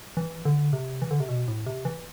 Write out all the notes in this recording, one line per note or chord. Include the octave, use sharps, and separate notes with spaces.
E3
D3
C3
E3
D3
C3
B2
A2
C3
E3